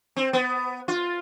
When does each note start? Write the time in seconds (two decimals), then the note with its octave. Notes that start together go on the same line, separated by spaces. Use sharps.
0.16 C4
0.33 B3
0.88 F4